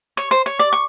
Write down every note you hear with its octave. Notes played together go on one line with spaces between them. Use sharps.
C#5
C5
C#5
D5
C#6